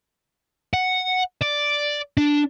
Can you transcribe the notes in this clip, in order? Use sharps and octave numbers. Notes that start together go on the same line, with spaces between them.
F#5
D5
D4